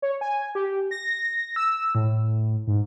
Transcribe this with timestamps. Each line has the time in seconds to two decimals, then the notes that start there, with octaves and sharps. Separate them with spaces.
0.02 C#5
0.21 G#5
0.55 G4
0.91 A#6
1.56 E6
1.95 A2
2.67 G#2